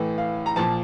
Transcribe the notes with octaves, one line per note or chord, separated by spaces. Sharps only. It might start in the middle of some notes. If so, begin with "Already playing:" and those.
Already playing: A2 E3
F5
A#5
A#2 F3 A5